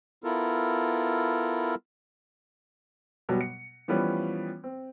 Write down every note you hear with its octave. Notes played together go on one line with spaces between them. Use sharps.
B3 E4 F4 A4 A#4
B2 F#3 G3 B3
C#7
E3 F3 G3 B3 C#4 B4
C4